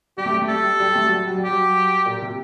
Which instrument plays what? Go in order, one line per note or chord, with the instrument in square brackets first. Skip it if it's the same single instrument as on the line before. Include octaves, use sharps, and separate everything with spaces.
[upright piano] G3 [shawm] G4
[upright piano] A3
G3
A3
[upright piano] G3 [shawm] A4
[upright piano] G3
A3
F#3
G3
F#3
[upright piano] G3 [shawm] G4
[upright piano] F#3
A#2
C3